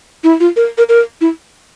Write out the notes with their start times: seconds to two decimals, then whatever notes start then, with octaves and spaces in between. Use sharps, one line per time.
0.24 E4
0.40 F4
0.56 A#4
0.78 A#4
0.89 A#4
1.21 E4